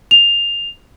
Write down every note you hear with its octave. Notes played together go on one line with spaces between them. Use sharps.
F7